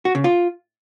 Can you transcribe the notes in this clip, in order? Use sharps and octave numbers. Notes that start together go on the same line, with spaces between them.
F#4
C#3
F4